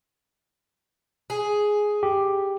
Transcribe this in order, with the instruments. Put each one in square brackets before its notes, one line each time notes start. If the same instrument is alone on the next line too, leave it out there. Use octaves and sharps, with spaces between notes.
[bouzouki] G#4
[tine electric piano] G4